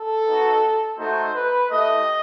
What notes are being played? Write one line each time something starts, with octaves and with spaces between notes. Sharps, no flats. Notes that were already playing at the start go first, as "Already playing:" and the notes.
Already playing: A4
B3 D#4 F#4
A3 D#4 F#4 C5
B4
A3 E4 G4 D#5